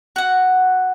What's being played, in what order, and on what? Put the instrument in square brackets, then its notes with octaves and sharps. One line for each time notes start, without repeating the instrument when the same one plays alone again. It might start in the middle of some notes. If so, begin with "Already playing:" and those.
[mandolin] F#4 F#5